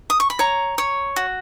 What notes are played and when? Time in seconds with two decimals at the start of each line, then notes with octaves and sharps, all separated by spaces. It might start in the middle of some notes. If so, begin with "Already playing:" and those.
0.10 D#6
0.20 C#6
0.30 B5
0.39 C#5 A#5
0.78 C#5
1.16 F#4